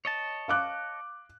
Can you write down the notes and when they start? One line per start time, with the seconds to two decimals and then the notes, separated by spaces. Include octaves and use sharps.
0.05 C#5 D#5 A5
0.48 F5 D6 F#6